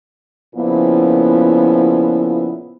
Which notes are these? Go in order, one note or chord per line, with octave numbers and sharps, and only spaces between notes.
A#2 C#3 F3 B3 E4